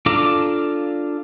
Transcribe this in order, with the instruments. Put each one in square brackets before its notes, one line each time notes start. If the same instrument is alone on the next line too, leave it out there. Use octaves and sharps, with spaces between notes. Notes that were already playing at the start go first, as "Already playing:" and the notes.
[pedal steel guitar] D4 F4 A4 A#5 D6